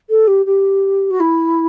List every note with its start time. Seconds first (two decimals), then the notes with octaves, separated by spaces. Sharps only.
0.09 A4
0.27 G4
0.45 G4
1.10 F#4
1.20 E4